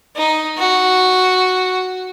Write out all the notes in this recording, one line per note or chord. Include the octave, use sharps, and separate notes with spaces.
D#4
F#4